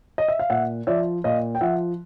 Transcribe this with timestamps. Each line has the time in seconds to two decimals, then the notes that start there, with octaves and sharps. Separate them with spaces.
0.18 D#5
0.28 E5
0.39 F5
0.50 A#2 E5 F#5
0.87 F3 D5 E5
1.24 A#2 D#5 F5
1.55 G5
1.61 F3 E5 F#5